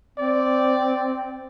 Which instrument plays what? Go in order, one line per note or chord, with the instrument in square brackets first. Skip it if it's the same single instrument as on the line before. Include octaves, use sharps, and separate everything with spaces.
[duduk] C4 [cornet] D5